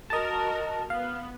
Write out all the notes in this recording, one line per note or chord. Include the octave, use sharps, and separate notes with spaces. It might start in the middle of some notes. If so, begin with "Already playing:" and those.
F#4 A#4 D#5 A5
B3 F5